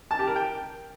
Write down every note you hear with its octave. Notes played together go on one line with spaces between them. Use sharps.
A5
G4
A#4
G5